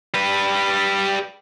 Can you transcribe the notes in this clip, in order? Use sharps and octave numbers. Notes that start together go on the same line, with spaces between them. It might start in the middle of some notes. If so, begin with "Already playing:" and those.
G3 B4